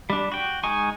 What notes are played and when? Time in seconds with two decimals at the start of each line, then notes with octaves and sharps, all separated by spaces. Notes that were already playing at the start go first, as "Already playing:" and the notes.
0.10 G3 D4
0.32 F#4 G5
0.63 G#3 D#4 G#5 C#6